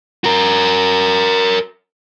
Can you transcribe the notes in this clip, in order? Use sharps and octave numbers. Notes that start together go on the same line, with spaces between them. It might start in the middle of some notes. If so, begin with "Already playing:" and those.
F#4 A#4